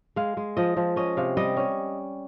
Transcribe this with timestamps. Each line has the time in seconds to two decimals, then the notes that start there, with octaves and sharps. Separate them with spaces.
0.16 G#3 F5
0.37 G#3
0.57 F3 D#5
0.77 F3
0.96 C#4 D#5
1.17 C3 F5
1.37 G3 D#5
1.57 C#4